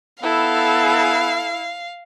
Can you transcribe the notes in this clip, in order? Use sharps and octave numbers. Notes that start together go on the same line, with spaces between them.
B3 E4 A4 F5